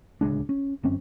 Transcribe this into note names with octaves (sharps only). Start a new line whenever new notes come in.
D1 C#2 G#3 D4
C#4
G1 F#2 C4 C#4